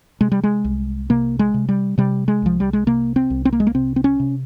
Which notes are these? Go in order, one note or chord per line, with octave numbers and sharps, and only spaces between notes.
C3 G#3
G3
G#3
C2
C3 A#3
G#3
C3
G3
C3 G3
G#3
C2 F3
G3
G#3
C3 A#3
C4
C2
C4
A#3
G#3
A#3
C3 C4
C4
C#4
C3